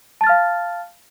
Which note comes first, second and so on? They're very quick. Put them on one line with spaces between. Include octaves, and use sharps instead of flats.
A5 A6 F6 F5